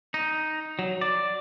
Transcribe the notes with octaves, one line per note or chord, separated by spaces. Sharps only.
D#4
F#3
D5